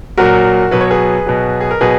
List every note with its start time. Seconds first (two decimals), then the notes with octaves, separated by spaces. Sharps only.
0.18 A#2 F#3 F#4 A#4
0.71 B2 F#3 B4
0.81 C#5
0.91 G#4 B4
1.26 B2 F#3
1.61 G#4
1.71 A#4
1.81 B2 F#3 G#4 B4